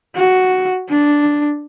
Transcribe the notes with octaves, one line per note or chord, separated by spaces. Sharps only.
F#4
D4